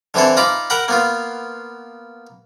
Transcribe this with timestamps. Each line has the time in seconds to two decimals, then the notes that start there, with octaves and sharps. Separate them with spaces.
0.14 D3 E3 C4 E4 A4
0.37 D#4 F4 A#5 B5 D6
0.70 A#4 F#5 G5 A#5 B5
0.88 A#3 B3 F4